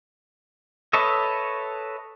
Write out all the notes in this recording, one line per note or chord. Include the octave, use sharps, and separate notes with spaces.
A4 B4 C#5 D#5 E5